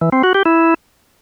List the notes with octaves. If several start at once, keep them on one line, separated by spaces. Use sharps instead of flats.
E3
C4
F#4
G4
E4